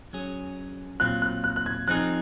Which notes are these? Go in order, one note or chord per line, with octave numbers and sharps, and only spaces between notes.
F#3 C#4 G#4
A#2 F#3 C4 F4 F#6
F#6
F#6
F#6
G#6
F3 C4 D#4 G#4 F#6